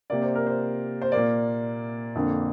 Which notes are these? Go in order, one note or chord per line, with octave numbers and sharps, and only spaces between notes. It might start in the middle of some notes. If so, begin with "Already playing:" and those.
C3 A#3 D5
C5
A#4
C5
C5
A#2 A#3 D5
F2 D3 A#3